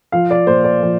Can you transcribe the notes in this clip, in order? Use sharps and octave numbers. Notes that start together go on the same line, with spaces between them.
F3 F5
D5
A#2 C5
D5
F3